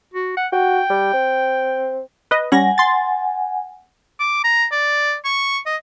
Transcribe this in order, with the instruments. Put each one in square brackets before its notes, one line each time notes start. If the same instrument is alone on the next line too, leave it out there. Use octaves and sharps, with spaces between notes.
[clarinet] F#4
F#5
[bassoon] F#4 [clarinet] G5
[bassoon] G3
C4
[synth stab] B4 D#5
[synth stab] G3 C#4 A#6 [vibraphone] F#5 G#5
[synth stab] C6 A6
[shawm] D6
A#5
D5
C#6
D#5